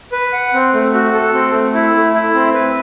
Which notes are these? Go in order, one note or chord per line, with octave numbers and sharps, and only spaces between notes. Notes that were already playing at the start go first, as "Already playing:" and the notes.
B4
F#5
C4
A3
F#4
A4
C4
A3
E4
A3
E4
C4
B4